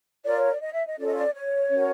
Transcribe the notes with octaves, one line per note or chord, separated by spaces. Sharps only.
F4 A#4 C#5 D5
C#5
D5
D#5
E5
D#5
C#4 F4 A4 D5
D#5
D5
C#5
C#4 F#4 A#4